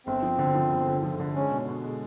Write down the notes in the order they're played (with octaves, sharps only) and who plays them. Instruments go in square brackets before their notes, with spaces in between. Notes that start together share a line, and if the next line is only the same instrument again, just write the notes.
[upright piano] G1 [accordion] C4
[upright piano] F3
D3
F3
G1
D3
F3
D3
[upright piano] G#3 [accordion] C#4
[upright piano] B2
B2
G#3